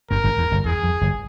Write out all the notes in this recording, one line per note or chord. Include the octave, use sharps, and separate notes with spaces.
G1 G2 A#4
G#1 G#2
E2
G1 G2
E2 G#4
F2
G1 G2